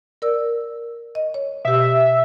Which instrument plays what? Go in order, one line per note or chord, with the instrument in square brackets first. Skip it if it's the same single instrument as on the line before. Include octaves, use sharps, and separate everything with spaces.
[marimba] A#4 D5 E6
D#5
C#5
[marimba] B2 G4 [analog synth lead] E5